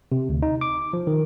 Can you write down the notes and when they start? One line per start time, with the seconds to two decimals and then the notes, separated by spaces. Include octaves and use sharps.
0.12 C3
0.29 D2
0.42 D#4
0.61 D6
0.93 F3
1.07 D#3